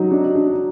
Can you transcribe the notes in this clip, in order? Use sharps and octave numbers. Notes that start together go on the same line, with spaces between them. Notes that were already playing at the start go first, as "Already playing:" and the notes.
Already playing: F#3 D#4
D4
D4